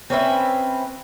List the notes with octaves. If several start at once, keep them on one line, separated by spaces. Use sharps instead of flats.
C4 C#4 B4 E5